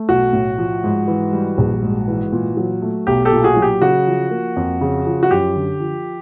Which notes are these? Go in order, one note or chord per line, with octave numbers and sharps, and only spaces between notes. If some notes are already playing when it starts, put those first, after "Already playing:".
Already playing: A3
B1 F#4
A2
F3
G#2
E3
G3
A#1
G#2
E3
A#2
F#3
A3
B1 G4
G4 A4
A#2
F#4 G#4
F#3
G4
C#3 F#4
F3
A#3
F2
C#3
F3
F#4
F#2 G4
D3
F3